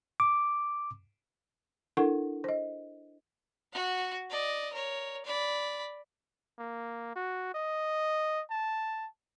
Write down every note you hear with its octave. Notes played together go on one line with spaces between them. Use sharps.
D6
D4 E4 A4 A#4 F#5 C#6
C5 D#5
F#4 F#5
D5 D#5
A#4 C#5
D5 B5
A#3
F#4
D#5
A5